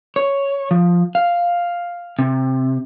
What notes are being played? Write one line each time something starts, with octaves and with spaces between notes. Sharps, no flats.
C#5
F3
F5
C3